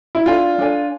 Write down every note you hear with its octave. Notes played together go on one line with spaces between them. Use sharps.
E4
D4 F4 A4 D5 G#5
D4 A4 D5 G#5